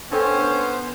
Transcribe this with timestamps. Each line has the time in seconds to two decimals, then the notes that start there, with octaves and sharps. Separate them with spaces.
0.11 B3 C#4 D4 A4 C5 G5